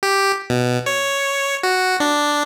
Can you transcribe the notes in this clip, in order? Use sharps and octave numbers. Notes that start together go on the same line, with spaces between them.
G4
B2
C#5
F#4
D4